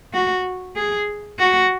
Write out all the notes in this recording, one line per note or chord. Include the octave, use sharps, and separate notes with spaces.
F#4
G#4
F#4